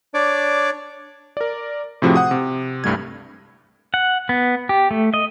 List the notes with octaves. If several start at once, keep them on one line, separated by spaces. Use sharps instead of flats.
D4 C#5 D5 D6
A#4 D5
A2 C3 F3 C4 F#4 G#4
F#5 D#6
C3
C2 G2 G3 A3 G#6
F#5
B3
G4
A3
D#5